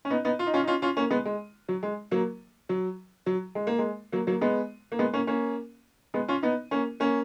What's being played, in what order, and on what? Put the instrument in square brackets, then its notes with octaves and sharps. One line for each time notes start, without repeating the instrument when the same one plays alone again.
[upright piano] C#4
B3 D#4
B3 D#4
F4
D#4
C#4 F4
D#4
C#4 F4
C#4 F4
A#3 C#4
G#3 B3
G#3
F#3
G#3
F#3 A#3
F#3
F#3
G#3
A#3
G#3
F#3 A#3
F#3 A#3
G#3 B3
A#3
G#3 B3
A#3 C#4
A#3 C#4
G#3 B3
C#4 F4
B3 D#4
A#3 C#4
A#3 C#4